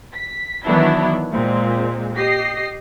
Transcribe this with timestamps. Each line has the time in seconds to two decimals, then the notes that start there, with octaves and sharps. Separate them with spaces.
0.14 B6
0.66 D#3 E3 F#3 B3 D4 E4
1.32 A#2 G#3 C4
2.16 G4 D#5 A#6 C7